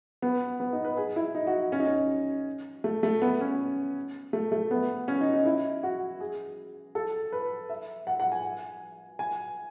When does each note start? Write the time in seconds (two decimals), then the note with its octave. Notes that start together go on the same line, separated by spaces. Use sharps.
0.22 B3
0.60 B3
0.73 D#4
0.85 B4
0.97 G#4
1.16 E4
1.35 D#4
1.47 F#4
1.72 C#4
1.80 D#4
1.87 C#4
2.84 A3
3.03 A3
3.22 B3
3.40 C#4
4.33 A3
4.52 A3
4.71 B3
5.08 C#4
5.21 D#4
5.33 D#4
5.46 E4
5.83 F#4
6.20 G#4
6.95 A4
7.32 B4
7.70 E5
8.07 F#5
8.20 F#5
8.32 G#5
9.19 G#5